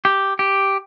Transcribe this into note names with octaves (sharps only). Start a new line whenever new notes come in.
G4
G4